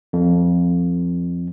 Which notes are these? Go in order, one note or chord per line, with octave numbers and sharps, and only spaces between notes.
F2